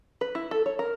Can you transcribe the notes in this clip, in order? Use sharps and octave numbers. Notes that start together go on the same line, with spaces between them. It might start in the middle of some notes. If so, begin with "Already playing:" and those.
B4
E4
A4
C#5
A#4